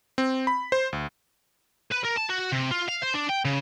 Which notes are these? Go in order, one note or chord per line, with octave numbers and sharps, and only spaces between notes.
C4
B5
C5
D2
B4
A#4
A5
F#4
C3
F4
F5
C5
D4
G5
C#3